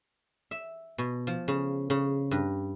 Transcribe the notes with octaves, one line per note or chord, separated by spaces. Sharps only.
E5
B2
F3
C#3
C#3
G2